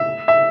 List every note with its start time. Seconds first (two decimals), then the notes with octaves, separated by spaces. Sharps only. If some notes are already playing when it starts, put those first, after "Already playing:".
Already playing: E5
0.28 E5